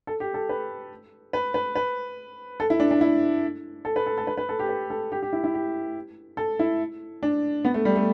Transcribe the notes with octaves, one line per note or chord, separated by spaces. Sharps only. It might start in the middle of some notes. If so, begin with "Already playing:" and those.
A4
G4
A4
B4
B4
B4
B4
A4
E4
D4
D4
E4
A4
B4
A4
A4
B4
B4
A4
G4
B4
A4
G4
G4
E4
E4
G4
A4
E4
D4
B3
A3
G3
A3